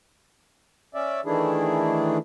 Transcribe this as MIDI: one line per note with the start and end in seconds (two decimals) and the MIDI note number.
0.95 1.21 61
0.95 1.21 74
0.95 1.21 76
1.25 2.18 51
1.25 2.18 52
1.25 2.18 57
1.25 2.18 62
1.25 2.18 64
1.25 2.18 68